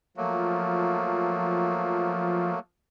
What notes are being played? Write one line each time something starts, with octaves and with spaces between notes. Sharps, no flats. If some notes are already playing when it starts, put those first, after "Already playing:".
F3 F#3 A3 A#3